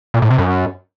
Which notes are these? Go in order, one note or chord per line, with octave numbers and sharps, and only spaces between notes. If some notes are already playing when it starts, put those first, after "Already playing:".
A#2
A2
C3
F#2